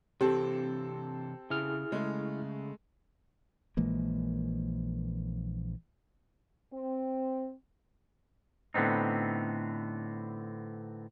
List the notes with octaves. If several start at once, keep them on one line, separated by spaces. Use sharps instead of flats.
C3 E3 C4 G4 A4
C#3 E4 G#4 F6
C#3 G#3 A3
A#1 E3 G#3 A#3
C4
A2 D3 B3 C4 D#4